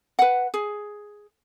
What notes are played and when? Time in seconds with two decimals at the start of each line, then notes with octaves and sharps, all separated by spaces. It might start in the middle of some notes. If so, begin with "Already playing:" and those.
0.19 B4 F#5
0.54 G#4